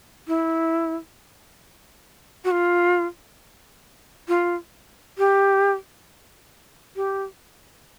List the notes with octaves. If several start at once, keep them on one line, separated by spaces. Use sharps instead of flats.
E4
F#4
F4
F4
G4
G4